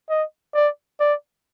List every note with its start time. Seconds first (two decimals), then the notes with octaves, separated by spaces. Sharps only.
0.10 D#5
0.55 D5
1.00 D5